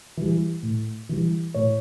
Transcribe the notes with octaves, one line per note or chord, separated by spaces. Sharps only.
E3 G3
A2
E3 G3
A2 C#5